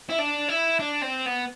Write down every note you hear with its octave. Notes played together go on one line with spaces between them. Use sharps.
E4
D4
E4
D4
C4
B3